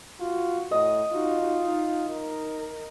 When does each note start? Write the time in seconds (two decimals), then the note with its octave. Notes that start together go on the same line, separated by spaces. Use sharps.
0.20 F4 F#4
0.71 A2 D#5
1.12 D#4 F4 F#4
1.64 D#4
2.10 D#4 A#4